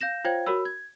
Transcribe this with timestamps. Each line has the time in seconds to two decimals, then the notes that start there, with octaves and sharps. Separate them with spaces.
0.01 F5 G6 A#6 E7
0.24 F4 C5 C#5 F5 G5 G#6
0.46 F#4 A#4 C#5 B5 E6
0.65 G#6